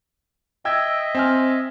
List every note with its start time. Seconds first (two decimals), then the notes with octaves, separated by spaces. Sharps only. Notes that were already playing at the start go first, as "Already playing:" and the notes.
0.65 D#5 E5 G5 E6 G#6
1.15 C4 G#5 F6